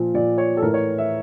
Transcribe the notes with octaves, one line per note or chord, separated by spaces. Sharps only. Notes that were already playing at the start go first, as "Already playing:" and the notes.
Already playing: A#2 F3
A#2 F3 D5
C#5
A4
A2 E3 A#4
C#5
E5